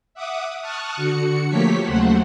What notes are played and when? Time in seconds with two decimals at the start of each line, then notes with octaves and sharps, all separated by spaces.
0.14 E5 F#5 D6 D#6
0.62 A5 C#6 D#6 F6 F#6
0.97 D3 F#4 C#7
1.50 F3 A3 A#3 G4 C#5 B6
1.84 D#2 C#3 F#3 A3 C5 F#5